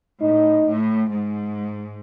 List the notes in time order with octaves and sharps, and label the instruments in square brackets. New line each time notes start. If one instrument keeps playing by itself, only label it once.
[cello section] A2 [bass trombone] D#4
[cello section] A2
G#2